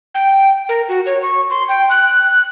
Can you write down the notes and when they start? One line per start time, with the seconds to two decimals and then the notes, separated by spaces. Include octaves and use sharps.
0.15 G5
0.69 A#4
0.89 F#4
1.06 C#5
1.22 C#6
1.50 C6
1.69 G5
1.90 F#6